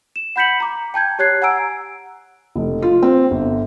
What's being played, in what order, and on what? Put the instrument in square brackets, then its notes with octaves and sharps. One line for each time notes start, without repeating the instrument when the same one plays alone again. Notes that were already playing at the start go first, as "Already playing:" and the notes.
[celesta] E7
F#5 B5 G6 B6 C#7 F#7
A#5 D6
G5 A5 G6 G#6
G4 C#5 F#6 G#6 C7
F#5 G#5 A#5 E6 D7
[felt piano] F1
F4
C4
G1